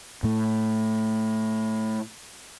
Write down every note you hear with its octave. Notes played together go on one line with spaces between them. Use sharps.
A2 A3